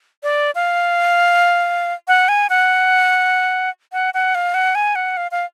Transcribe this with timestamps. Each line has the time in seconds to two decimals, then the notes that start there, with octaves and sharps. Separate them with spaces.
0.23 D5
0.55 F5
2.08 F#5
2.29 G#5
2.50 F#5
3.93 F#5
4.14 F#5
4.35 F5
4.54 F#5
4.75 G#5
4.95 F#5
5.17 F5
5.31 F5